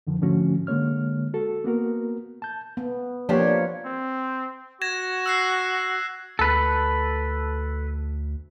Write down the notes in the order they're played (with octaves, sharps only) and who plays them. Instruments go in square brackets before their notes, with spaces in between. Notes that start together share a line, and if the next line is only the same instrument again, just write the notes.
[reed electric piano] F2 D3 D#3 F3
G#2 D3 F3 A3 C#4 F#4
D3 G#3 A#3 C#5 F6
F#4 A4
A#3 B3 F#4 A#4
A5 G6
[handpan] B3
[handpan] F3 A#3 C#5 [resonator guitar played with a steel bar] D4 F4 G4
[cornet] C4
[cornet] F#4 [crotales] G#6 A#6 E7
[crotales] E6 F#6 C7
[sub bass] D2 [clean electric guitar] A4 B4